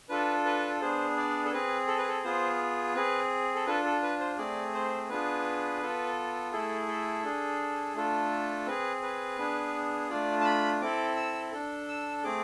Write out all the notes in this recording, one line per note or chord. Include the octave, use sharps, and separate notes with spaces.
D4 F4 A4 B4
B4
B3 D4 G#4 C5
D5
A4
C4 G#4 B4
A4
B4
A4
B3 F4 G#4 C5
C4 G#4 B4
A4
D4 F4 A4 B4
A4
B4
C5
A3 C4 G#4 D5
C5
B3 D4 F4 G#4 B4
B3 F4 A4
A3 E4 G#4 A4
A4
D4 G#4
A3 D4 F4 A4
C4 G#4 B4
B4
B3 D4 G#4
A3 D4 F4 D5
A5
B5
C4 E4 A4 D6
E6
D4 A4
E6
A3 C4 G#4 D6